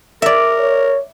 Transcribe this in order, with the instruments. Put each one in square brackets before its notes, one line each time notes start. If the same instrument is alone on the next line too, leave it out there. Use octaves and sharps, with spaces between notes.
[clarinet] A#4 [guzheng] D5 E5
[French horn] C#5